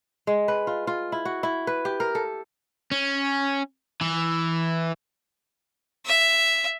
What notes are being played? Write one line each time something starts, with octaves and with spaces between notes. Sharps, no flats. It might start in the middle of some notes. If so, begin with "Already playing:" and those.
G#3
B4
F4
F4
E4
F#4
E4
B4
G4
A#4
A4
C#4
E3
E5